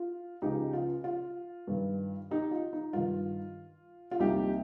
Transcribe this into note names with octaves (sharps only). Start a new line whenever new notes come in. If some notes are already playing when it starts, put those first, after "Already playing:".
Already playing: F4
C#2 C#3 F3 D#4 G4
F4
F4
G2 D#3
D#4 G4
F4
D#4
G2 D#3 F4
F4
C2 A#2 F3 D#4 G4